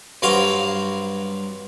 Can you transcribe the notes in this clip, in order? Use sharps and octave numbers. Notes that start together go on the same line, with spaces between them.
G2 F#3 C4 F5 A#5 C6